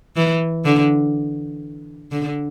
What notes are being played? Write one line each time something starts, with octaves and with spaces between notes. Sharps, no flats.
E3
D3
D3